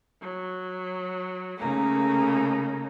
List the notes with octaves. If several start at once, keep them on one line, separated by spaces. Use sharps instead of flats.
F#3
C#3 A3 A#3 D#4